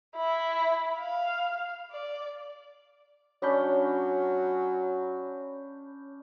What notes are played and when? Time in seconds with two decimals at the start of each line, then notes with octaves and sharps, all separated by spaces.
0.16 E4
0.99 F5
1.92 D5
3.42 F#3 C#4 D4 C#5 B5 G6